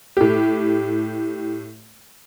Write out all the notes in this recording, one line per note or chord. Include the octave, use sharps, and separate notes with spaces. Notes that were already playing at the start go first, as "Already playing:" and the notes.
A2 G4